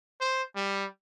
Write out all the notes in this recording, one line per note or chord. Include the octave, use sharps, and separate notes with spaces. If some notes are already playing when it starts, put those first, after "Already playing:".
C5
G3